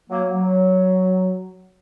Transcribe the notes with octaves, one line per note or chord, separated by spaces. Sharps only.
F#3 A#3
F#3